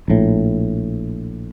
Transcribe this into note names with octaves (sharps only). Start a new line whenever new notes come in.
A#1 A2